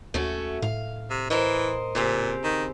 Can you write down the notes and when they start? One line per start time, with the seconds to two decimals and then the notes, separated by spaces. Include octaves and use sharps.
0.14 D#2 A3 C#4 F#4
0.62 A2 F5
1.10 C3
1.30 E3 A#4 C5 D#5
1.95 A#2 C#3 C4 G4
2.44 D#3